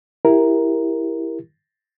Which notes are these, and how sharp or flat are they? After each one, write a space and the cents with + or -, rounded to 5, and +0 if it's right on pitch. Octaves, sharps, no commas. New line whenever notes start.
E4 +0 G4 +10 A#4 +5